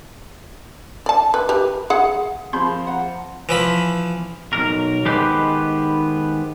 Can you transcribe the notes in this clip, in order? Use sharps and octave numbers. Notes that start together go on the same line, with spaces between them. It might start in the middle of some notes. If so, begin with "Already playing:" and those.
D5 A5
B4
G4 B4
G#4 F#5
F3 C4 G#4 A#4 B5 C6 G6
F#5 A#5
E3 F3 B5
B1 F2 A#4
D#3 G#3 B3 G4 B4 C5